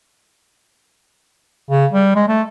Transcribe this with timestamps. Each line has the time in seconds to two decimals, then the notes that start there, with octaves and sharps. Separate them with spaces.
1.71 C#3
1.92 G3
2.16 G#3
2.28 A3